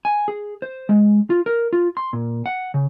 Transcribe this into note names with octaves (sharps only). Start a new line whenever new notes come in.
G#5
G#4
C5
G#3
F4
A#4
F4
C6
A#2
F#5
C#3